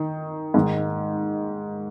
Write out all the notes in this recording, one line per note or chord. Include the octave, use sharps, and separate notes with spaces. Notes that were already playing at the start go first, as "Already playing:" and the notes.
Already playing: D#3
G#2 D#3